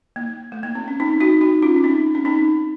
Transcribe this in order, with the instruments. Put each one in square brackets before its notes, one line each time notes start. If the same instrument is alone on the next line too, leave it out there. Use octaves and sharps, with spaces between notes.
[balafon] A#3
A3
A#3
C4
C#4
C4 D#4
D#4 F#4
D#4 F#4
C#4 F4
C#4
C4 D#4
C#4
C4 D#4